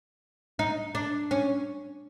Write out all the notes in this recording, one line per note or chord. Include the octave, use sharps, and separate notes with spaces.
D#4
D4
C#4